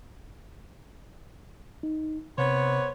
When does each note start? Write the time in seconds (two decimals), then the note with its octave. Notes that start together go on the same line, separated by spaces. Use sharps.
1.83 D#4
2.38 C3 B3 C5 C#5